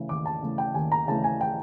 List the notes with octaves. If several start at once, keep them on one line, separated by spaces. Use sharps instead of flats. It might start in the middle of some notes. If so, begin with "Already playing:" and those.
Already playing: C#3 E3 A3
D#2 D6
A5
C#3 E3 A3
G5
D#2 G#5
A#5
C#3 E3 A3 A5
G#5
G5